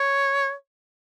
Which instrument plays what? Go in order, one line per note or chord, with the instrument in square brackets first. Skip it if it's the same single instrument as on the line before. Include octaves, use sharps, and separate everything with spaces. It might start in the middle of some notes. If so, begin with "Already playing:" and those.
Already playing: [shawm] C#5